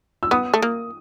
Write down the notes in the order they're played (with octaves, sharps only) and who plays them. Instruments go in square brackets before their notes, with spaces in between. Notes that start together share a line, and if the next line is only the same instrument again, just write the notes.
[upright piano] E6
[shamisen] B3 [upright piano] D#6
[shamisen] A3
A#3